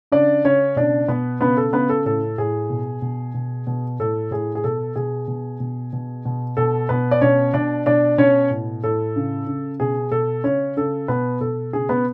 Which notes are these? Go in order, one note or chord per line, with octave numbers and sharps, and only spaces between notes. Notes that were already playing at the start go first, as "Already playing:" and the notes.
C#3 D4 D5
C#3 C#4 C#5
B2 D4 D5
B2 B3 B4
C#3 B3 B4
A4
C#3 B3 B4
A4
A2 A4
A2 G#4
B2
B2
B2
B2
A2 A4
A2 G#4
G#4
B2 A4
B2 G#4
B2
B2
B2
B2
B2 A4
B2 B3 B4
D5
B2 C#4 C#5
B2 D4 D5
B2 D4 D5
B2 C#4 C#5
A2
A2 A4
C#3
C#3
B2 G#4
B2 A4
C#3 C#4 C#5
C#3 A4
B2 B3 B4
B2 A4
C#3 G#4
B3 B4